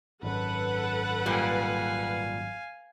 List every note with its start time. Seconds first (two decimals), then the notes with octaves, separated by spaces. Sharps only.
0.23 G#1 F#2 A4 B4 F#5
1.26 A#2 G3 F5 G#5